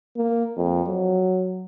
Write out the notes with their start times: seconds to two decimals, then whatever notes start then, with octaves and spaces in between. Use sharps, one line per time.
0.17 A#3
0.57 F2
0.88 F#3